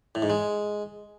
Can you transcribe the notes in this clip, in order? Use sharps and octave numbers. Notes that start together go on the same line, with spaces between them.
A2
G#2
G#3